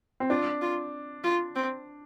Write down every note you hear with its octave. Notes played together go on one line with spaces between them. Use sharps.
C4
D4 F4
F4
F4
C4